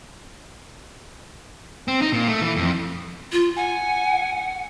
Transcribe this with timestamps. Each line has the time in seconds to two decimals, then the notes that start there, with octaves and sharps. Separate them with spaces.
1.88 C4
2.02 D#4
2.13 A#2
2.28 A3
2.42 E3
2.57 F2
3.32 F4
3.56 F#5 G#5